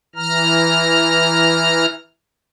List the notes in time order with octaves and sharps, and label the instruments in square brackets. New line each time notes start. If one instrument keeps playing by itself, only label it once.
[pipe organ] E3 A#5 F6